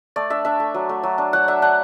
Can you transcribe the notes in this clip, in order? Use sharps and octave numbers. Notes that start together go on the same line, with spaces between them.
A3 D5
D4 E5
D4 E5
A3
F#3
A3
F#3
D4
F#3 F#5
D4 E5
D4 F#5